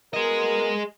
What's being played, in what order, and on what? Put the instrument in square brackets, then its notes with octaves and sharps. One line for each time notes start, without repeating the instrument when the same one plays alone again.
[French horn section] B3 F#4 A#4 [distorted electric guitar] G#4 D#5